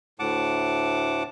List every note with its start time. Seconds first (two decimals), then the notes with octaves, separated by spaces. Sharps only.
0.19 D2 A2 F#5 A5 D6